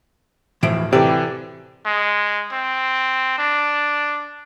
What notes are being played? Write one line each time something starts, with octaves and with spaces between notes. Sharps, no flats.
D1 A2 E3 F3 D7
C3 E3 G4 A4 B4 D5
G#3
C4
D4